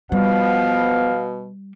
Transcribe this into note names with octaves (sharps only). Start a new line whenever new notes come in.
B2 F3 G3 B3 F5